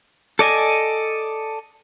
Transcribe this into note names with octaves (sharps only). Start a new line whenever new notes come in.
A4 D5 D#5 G#5